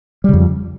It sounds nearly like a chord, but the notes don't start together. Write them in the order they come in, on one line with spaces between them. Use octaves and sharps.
G3 C#3 F2